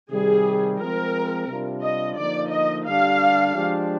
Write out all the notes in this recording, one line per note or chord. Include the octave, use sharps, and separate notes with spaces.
C3 D#3 G3 G#4
F3 G#3 C4 A#4
C3 G3 D4 F4
D#5
D3 F3 A#3 D#4 D5
D#5
D3 G3 D4 G4 F5
F3 G#3 D4 G4